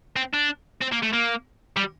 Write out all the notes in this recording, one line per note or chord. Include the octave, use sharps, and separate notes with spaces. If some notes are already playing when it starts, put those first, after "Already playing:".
C4
D4
C4
A#3
A3
A#3
G3